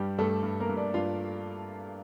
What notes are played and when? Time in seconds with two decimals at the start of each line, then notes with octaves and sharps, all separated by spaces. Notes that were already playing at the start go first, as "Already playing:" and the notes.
Already playing: G2 G3 G4
0.18 G2 A3 A4
0.43 G2
0.60 A#3 A#4
0.69 G2
0.77 D4 D5
0.94 G2 F4 F5